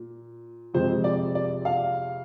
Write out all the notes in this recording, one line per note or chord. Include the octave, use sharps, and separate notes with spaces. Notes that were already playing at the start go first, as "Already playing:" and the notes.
Already playing: A#2
F2 C3 F3 G#3 C5
D5
D5
F5